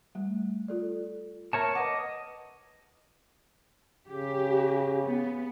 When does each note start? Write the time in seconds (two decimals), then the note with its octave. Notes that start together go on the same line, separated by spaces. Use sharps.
0.15 G3 A3
0.68 F4 A4 D5
1.53 A#4 C#5 E5 A5
1.75 B4 D#5 F#5 D6
4.08 C#3 G4
5.03 B3